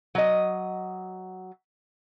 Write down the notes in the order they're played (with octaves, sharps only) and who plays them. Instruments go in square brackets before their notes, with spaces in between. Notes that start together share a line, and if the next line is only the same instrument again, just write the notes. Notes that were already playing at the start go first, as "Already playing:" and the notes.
[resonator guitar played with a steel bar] F#3 D#5